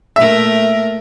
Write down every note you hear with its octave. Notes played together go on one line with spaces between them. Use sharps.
A#2 A3 A#4 E5